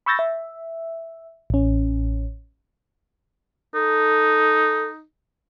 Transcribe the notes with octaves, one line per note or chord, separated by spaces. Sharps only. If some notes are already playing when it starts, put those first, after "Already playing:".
B5 C#6 E6 G6 A6 A#6
E5
A1 C#4
D#4 A4